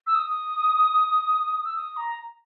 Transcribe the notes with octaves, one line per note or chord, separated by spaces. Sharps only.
E6
D#6
E6
D#6
A#5